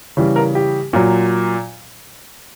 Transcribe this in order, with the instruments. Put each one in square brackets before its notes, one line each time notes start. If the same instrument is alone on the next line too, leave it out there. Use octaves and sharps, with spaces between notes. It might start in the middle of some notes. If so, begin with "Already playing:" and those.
[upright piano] C#3 E3 G3
A#4
G4
A#2 F#3